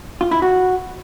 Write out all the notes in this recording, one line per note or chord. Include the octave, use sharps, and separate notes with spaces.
F4
E4
F#4